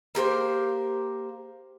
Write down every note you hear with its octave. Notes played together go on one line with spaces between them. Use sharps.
A#3 G4 A#4 C5